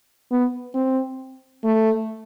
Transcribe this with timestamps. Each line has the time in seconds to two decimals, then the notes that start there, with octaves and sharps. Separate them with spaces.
0.31 B3
0.75 C4
1.64 A3